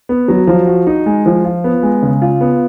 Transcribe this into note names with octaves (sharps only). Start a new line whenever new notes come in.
B3
F#3
F3
F#4
D#4
G#3
F3
F4
B3
G#3
C#3
F4
B3